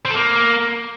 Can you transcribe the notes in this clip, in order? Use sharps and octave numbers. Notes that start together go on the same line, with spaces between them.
C4
A4
A#3